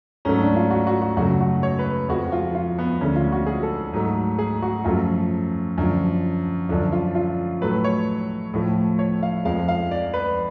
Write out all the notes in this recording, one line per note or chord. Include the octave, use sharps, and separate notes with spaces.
G#2 F#3 A3 C#4
D4
F4
F#4
F#4
F#4
F#2 C#3 F#3 A3 F#4
F#4
C#5
B4
F2 F3 G#3 F#4
F4
F4
B3
D2 D3 G#3 C#4
F4
F#4
G#4
A4
G#2 F#3 A3
G#4
F#4
F#2 F3 A3 F4
F#2 D3 F3
F#2 D3 F3 D4
F4
F4
A2 F#3 A3 B4
C#5
A2 F3 A3
C#5
F5
F2 F3 G#3 F5
F5
D5
B4